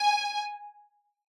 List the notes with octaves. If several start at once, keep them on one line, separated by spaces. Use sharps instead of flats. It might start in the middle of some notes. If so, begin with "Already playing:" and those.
Already playing: G#5